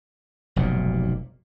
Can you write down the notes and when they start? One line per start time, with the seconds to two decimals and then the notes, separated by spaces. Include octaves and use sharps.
0.56 F1 B1 G2 A#2